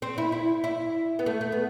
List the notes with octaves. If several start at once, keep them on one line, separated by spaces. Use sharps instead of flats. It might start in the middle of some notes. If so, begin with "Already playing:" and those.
C4
E4
E4
E4
B3
A3
A3
B3